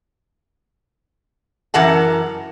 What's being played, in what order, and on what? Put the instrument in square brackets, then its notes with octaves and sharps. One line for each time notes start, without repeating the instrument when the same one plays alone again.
[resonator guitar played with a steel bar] F#2 E3 A#4 F#5 A5